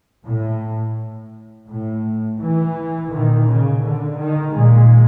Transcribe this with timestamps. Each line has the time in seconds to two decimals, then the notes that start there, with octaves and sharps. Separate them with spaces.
0.25 A2
1.68 A2
2.39 E3
3.11 A#2 D#3
3.47 C#3
3.82 D3
4.19 D#3
4.54 A#2 G#3